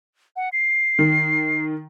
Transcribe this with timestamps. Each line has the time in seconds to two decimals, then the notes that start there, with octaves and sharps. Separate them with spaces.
0.36 F#5
0.53 C7
0.99 D#3